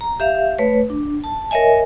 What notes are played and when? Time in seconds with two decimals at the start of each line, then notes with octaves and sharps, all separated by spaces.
0.01 A#5
0.20 G4 E5 F5
0.59 A3 B4 C#5
0.90 D4
1.24 A5
1.51 A#4 C#5 D#5 E5 G#5